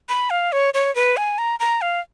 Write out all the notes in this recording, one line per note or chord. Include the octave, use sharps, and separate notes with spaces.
B5
F5
C#5
C#5
B4
G#5
A#5
A#5
F5